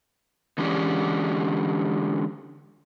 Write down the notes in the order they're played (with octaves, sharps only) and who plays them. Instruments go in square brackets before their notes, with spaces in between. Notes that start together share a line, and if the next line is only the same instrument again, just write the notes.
[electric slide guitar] D3 E3 G#3 C#4 G4 D5